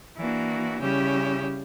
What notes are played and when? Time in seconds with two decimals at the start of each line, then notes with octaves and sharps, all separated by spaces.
0.17 E3 A#3 D4 F#4
0.80 C#3 G3 C#4 E4 G4